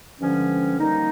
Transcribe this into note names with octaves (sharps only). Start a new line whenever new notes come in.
G2 D3 F3 G#3 C#4
D#3 G3 A#3 D#4